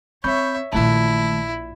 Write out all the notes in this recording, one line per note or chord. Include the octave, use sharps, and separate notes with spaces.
C4 C#5 E5 B5 C#6 G6
A#1 A#2 D#3 A3 E4 A5